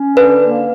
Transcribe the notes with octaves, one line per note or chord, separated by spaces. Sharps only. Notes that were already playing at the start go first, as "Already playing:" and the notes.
Already playing: C#4
D3 B4
A#3